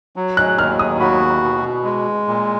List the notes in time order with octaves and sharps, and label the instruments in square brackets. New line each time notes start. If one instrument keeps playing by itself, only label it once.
[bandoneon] F#3
[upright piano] F#6
[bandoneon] D#2 [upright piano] F6
[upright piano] D#6
[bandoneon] F#4 [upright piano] B5
[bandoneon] B2
G#3
A#2